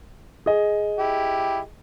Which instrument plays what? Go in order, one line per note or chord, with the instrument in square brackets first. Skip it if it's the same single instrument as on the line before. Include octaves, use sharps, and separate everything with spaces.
[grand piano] G#4 D#5
[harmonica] E4 G4